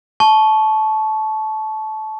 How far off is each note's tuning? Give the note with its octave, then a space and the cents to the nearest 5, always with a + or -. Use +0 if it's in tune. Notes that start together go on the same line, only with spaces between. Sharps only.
A5 -20 C#6 +0